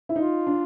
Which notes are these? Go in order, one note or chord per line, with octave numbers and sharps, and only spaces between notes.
E4
D#4 F4
D4